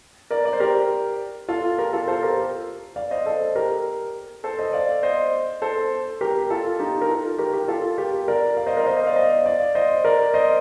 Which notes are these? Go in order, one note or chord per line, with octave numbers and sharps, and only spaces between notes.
A#4 D5
D5
C5
G4 A#4
F4 A4
G4 A#4
F4 A4
A4 C5
G4 A#4
D5 F5
C5 D#5
A4 C5
G4 A#4
A4 C5
C5 D#5
D5 F5
C5 D#5
A4 C5
G4 A#4
F4 A4
D#4 G4
A#4
F4 A4
G4 A#4
G4 A#4
F4 A4
G4 A#4
A#4 D5
D5 F5
C5 D#5
A#4 D5
C5 D#5
C5 D#5
D5 F5
C5 D#5
D5 F5
C5 D#5
A#4 D5
C5 D#5